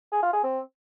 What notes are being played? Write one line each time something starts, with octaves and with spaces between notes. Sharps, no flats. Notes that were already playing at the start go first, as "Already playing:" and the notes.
G#4
F4
G#4
C4